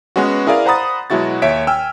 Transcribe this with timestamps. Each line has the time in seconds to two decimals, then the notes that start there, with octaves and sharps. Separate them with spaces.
0.16 G#3 B3 C#4 F#4
0.47 E4 G#4 A#4 D5 F5
0.66 C5 F#5 A#5 B5 D#6 A6
1.10 B2 F#3 G#3 E4 F#4 A6
1.42 D#2 C#5 E5 B6 D7
1.67 G5 G#5 E6 F6